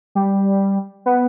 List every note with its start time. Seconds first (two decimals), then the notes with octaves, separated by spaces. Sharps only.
0.15 G3
1.06 B3